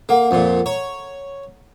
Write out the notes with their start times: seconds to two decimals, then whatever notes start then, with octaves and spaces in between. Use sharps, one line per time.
0.09 A#3 A4 F#5
0.31 F2 A#2
0.66 C#5 A#5